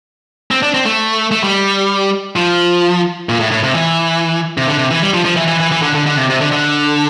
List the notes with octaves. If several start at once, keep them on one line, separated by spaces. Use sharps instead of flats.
C4
D4
C4
A3
A3
G3
F3
A#2
A2
A2
C3
E3
C3
D3
C3
E3
G3
F3
F3
E3
E3
E3
E3
D3
D3
D3
C3
C3
D3
D3